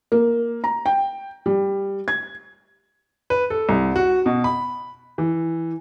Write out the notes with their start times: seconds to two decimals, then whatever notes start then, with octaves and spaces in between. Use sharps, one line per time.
0.12 A#3
0.64 A#5
0.86 G5
1.46 G3
2.08 G#6
3.30 B4
3.50 A4
3.69 C2
3.96 F#4
4.26 B2
4.44 B5
5.18 E3